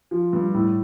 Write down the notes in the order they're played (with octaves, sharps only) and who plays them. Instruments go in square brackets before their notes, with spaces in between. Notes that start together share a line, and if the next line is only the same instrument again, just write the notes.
[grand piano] F3
G2
A2